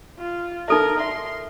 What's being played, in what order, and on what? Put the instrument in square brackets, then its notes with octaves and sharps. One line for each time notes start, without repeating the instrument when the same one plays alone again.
[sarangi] F4
[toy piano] D#4 A4 E5 [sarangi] A#4
[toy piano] E5 [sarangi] C6